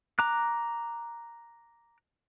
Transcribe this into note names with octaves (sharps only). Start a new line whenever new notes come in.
A#5 D6 F#6